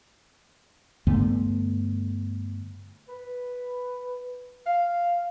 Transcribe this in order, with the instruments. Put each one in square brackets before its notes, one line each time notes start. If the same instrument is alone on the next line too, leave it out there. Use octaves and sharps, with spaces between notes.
[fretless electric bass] G2 D3 A3 B3
[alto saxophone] B4
F5